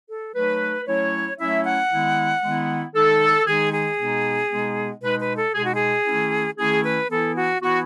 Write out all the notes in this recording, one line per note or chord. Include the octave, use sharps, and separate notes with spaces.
A4
F#3 A3 D#4 B4
F#3 A3 C#4 E4 C#5
F#3 A3 C#4 E4 E5
F#5
D#3 G#3 B3 E4
D#3 G#3 B3 E4
D#3 G#3 D#4 A4
D#3 G#3 D#4 G#4
G#4
B2 G#3 B3 D#4
B2 G#3 B3 D#4
B2 G#3 D#4 B4
B4
A4
B2 G#3 D#4 G#4
F#4
G#4
D#3 A3 C#4 E4
D#3 A3 C#4 E4 G#4
B4
E3 B3 E4 A4
F#4
E3 B3 E4 F#4